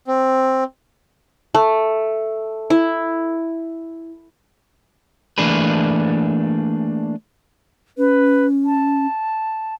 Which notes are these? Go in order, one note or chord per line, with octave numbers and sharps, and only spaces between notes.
C4
A3
E4
E3 A3 A#3 D4 G#4 B4
C#4 B4
A5